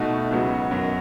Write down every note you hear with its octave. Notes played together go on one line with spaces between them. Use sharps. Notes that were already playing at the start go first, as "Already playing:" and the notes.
Already playing: B2 A3 D#4 F#4
C#2 C#3 F#3 B3 F#4
F#2 D#3 F#3 B3